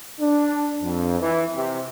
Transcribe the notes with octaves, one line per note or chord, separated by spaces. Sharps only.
D4
F2
E3
C3